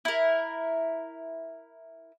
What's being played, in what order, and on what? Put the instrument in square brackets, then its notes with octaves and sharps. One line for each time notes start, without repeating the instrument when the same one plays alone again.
[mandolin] E4 A#4